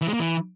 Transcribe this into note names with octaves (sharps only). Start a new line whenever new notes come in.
E3
G#3
A#3
E3